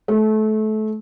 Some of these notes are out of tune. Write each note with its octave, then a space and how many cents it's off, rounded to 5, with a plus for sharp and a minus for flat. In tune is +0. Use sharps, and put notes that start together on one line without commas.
A3 -25